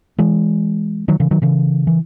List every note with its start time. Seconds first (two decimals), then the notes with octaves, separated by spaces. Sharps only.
0.18 E3 G#3
1.08 D#3 F#3
1.20 C#3 E3
1.31 D#3 F#3
1.42 C#3 E3
1.87 E3